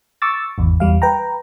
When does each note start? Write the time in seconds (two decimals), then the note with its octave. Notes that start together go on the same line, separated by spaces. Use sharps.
0.22 C#6 D6 E6 A6
0.58 G#1 E2
0.80 E2 G3 F5
1.02 B4 G5 A#5